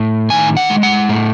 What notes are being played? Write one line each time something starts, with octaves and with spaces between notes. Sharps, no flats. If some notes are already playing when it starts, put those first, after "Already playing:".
Already playing: A2
D#3 G#5
F#5
G#3
F#5
A2